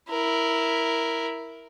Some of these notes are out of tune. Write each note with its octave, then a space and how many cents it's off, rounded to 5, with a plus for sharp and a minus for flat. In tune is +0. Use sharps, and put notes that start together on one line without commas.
E4 +0 A#4 +0